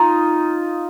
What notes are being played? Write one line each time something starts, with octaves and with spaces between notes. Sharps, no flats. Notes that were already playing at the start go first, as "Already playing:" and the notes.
Already playing: D#4 F4